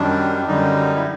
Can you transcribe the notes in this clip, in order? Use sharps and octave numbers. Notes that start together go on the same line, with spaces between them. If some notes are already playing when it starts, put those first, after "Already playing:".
Already playing: F#2 D#3 G3 D4
F#2 D3 G3 D#4
E4